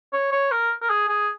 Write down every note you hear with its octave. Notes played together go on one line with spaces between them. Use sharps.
C#5
C#5
A#4
A#4
G#4
G#4